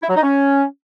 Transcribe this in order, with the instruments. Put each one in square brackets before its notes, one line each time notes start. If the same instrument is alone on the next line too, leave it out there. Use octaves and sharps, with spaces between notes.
[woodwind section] E4
F#3
D#4
C#4